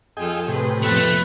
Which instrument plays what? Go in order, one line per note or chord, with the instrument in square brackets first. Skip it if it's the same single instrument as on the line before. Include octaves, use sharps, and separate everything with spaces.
[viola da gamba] F2 F4 A4 [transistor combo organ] G#4 D#5 G5
[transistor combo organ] A2 C3 G4 [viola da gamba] G#4 B4
[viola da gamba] F2 B3 [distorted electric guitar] A3 [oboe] B4